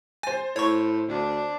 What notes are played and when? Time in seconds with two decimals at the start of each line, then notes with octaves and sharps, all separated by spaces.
0.23 C5 G#5 A6
0.56 A2 C#5 C#6
1.09 D2 D4